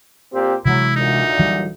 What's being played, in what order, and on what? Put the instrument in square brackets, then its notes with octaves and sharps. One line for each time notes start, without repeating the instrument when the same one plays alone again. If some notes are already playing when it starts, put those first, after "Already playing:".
[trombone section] A#2 C4 G4
[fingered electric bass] C3 E3 G#3 [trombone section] F#3 [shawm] E4
[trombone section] D2 A#2 [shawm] D#4
[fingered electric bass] E3 F#3 G3